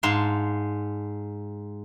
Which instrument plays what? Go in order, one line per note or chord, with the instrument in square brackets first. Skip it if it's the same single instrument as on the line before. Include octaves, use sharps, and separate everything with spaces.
[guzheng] G#2 F5 A5 C6